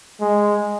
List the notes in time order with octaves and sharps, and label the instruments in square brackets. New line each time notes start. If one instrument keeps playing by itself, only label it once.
[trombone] G#3